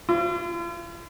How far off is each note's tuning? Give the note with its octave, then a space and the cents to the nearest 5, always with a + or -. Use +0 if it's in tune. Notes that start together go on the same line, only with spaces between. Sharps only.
F4 -45